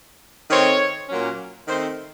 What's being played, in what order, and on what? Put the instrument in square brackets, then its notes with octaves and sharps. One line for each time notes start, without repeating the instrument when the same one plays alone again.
[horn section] D#3 A3 C4 C#5
A#2 F#3 A#3 C#4
D#3 A3 C4 C5